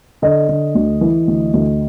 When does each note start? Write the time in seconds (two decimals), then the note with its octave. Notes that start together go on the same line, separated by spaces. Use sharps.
0.22 D3 D#5
0.49 D3
0.75 D2
1.01 E3
1.27 D2
1.53 D2